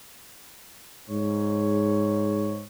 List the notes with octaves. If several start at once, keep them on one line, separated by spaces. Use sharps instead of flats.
G#2 C#5